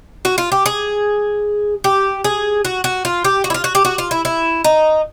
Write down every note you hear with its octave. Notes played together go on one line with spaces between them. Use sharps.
F#4
F4
G4
G#4
G4
G#4
F#4
F#4
F4
G4
F#4
E4
F4
F#4
G4
F#4
F4
E4
E4
D#4